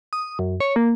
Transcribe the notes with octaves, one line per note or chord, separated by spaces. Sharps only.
D#6
F#2
C#5
A#3